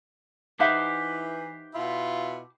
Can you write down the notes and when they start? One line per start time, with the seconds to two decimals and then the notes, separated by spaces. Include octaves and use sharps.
0.60 E3 D#4 G4 B4 C5 E5 F#5
1.74 B2 E4 F4